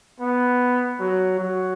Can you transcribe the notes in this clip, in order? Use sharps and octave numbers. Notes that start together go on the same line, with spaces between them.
B3
F#3
F#3